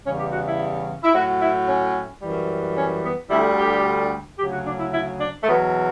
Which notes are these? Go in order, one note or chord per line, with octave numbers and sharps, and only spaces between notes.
E2 C#3 G3 C#4
G4
F#4
E4
E4
A2 F#3 F#4
E4
C#4
F#2 E3 G3
C#4
B3
D2 D3 G3 E4
G4
D2 C#3 F#3 G4
F#4
D4
E4
E4
D4
A3
E2 B2 F#3 B3